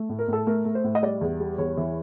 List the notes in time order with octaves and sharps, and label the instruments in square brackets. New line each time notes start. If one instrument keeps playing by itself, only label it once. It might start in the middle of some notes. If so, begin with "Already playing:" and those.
Already playing: [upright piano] A3
A2
A#4
A2 A4
A3 A#4
A3
C5
A2
D#5
G3 D5
E2
G3
E2 C#5
E3